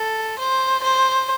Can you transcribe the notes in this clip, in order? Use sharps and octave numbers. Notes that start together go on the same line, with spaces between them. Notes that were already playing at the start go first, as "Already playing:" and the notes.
Already playing: A4
C5
C5